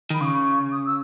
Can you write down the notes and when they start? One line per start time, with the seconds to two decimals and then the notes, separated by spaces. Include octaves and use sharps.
0.10 D#3 B5
0.21 C#3 D#6
0.24 C#6
0.64 C#6
0.71 D#6
0.86 E6